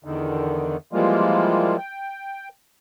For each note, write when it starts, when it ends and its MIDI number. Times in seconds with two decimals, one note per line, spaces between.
0.04 0.77 40
0.04 0.77 50
0.04 0.77 51
0.93 1.77 52
0.93 1.77 53
0.93 1.77 55
0.93 1.77 56
0.93 1.77 58
0.93 1.77 65
1.78 2.49 79